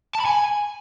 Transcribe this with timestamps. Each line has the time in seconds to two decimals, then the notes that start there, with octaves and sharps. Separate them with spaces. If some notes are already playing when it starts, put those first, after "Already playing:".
0.15 A5
0.20 B5
0.25 G#5